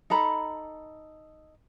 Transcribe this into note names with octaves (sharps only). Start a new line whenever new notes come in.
D#4 A4 A#5 B5